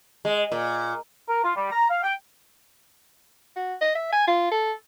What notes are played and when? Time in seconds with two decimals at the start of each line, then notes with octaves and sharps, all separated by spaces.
0.25 G#3
0.52 A#2
1.29 A#4
1.45 F4
1.57 G3
1.72 A#5
1.90 F5
2.04 G5
3.56 F#4
3.81 D#5
3.95 E5
4.12 G#5
4.28 F4
4.51 A4